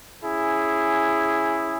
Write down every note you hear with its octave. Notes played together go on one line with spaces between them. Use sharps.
C#4 E4 G#4